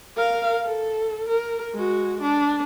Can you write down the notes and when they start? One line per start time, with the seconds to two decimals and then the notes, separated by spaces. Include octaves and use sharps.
0.16 A#4 F5
0.63 A4
1.28 A#4
1.74 G#3 F#4
2.22 D4